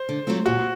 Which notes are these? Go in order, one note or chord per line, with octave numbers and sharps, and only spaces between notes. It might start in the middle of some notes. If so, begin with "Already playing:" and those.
Already playing: C5
D3
F#3 A3 C4 F4
A#2 F#4